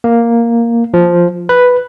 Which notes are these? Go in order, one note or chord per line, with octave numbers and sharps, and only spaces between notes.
A#3
F3
B4